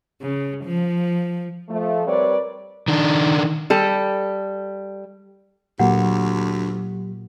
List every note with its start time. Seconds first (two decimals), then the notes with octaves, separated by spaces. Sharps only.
0.22 C#3
0.64 F3
1.69 F3 A3
2.07 G3 C4 A#4 B4 C#5 D5
2.88 D#3 D4
3.70 G3 A4
5.80 D2 A#2 F#3 A#3 G4 F#5